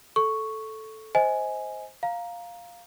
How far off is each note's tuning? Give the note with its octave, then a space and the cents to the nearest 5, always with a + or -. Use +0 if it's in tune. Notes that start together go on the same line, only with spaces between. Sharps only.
A4 -5 C#6 +0
C5 +0 D#5 +30 G#5 +0
F5 +0 A#5 +0